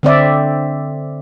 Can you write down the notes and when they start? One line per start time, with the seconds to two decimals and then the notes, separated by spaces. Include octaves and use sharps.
0.03 D3 C4 D5 E5